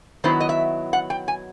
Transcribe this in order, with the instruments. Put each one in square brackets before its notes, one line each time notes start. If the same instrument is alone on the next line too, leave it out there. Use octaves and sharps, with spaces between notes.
[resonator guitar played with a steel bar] D#3 F#3 B3 E4 C5
D#5
E5
F#5
G5
G#5